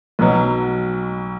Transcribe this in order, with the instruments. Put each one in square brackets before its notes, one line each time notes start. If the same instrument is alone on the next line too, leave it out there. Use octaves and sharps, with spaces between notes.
[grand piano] B1 B2 F#3